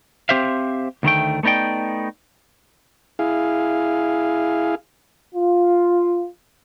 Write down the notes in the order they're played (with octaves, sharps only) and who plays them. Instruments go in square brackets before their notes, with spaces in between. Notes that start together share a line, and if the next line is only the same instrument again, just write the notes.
[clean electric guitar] C4 G4 C5 E5 F5
D2 D#3 A3 G5
A3 B3 D#4 D5 G5
[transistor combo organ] E4 G#4 F5
[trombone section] F4